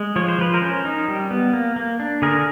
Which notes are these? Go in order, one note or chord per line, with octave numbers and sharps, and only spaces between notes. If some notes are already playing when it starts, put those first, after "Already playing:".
Already playing: G#3
F3 C#5
C5
F3 B4
A#4 C5
C#4
D#4
G3
B3
A#3
A#3
D4
D3 G#4 A#4